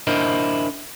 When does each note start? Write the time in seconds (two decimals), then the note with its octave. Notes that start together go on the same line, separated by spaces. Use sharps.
0.07 D4 E4 A#4 C5 D#5